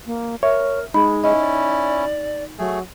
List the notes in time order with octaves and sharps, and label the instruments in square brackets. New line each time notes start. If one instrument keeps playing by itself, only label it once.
[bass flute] A#3
[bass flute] A#4 [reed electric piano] C#5 [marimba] E5
[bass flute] G#3 [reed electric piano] D#4 [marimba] B5
[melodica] C#4 E4 [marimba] D#5
[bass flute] D5
[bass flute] F#3 [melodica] A3 G#4